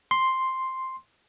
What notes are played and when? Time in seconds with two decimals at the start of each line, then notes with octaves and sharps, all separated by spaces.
0.11 C6